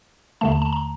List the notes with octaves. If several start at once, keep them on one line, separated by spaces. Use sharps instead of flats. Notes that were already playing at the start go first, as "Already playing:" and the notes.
D#2 D3 A3 A5
A5
A5
A#5